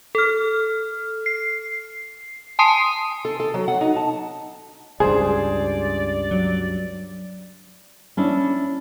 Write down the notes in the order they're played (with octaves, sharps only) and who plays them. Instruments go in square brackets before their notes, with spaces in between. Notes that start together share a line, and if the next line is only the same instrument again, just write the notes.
[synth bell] A4 F6
C7
G#5 A5 C6 D#6 C7 D#7
[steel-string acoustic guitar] A4
A4
F#3
F#5
D#4
A5
[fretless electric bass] C#2 G2 [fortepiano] G#4 C5 [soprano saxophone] D5
[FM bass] F#3
[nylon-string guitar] C#4 D4 E4